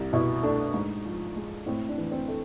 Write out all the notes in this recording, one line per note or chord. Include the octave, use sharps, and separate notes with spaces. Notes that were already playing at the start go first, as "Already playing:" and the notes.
Already playing: C2
B2 E4
A3 D4
G#2
F3
G#3
A2 C4
D4
E3
C4
A3